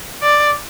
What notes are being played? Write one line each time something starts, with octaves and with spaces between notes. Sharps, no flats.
D5